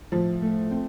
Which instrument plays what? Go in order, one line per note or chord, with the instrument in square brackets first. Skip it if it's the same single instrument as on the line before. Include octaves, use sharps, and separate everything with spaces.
[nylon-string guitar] A2 [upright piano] F3
[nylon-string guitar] A3
C4